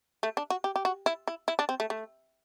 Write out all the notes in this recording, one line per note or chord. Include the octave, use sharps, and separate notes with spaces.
A3
D4
F#4
G4
G4
F#4
E4
E4
E4
D4
C4
A3
A3